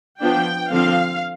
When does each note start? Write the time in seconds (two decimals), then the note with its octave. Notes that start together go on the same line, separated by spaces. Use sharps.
0.21 F3 B3 D4 G5
0.72 D3 F3 C4 F5